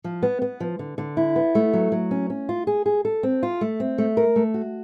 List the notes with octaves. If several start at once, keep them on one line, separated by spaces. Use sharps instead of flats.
F3
B3
B3
F3
D3
D3
E4
B3
A3
F#3
F#3
C#4
C#4
F4
G#4
G#4
A4
C4
F4
A3
C4
A3
A#4
A3
F#4